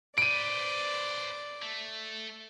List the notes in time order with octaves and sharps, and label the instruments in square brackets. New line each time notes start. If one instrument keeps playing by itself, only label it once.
[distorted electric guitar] B4 C5 [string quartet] D5 [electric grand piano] D7 D#7
[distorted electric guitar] A3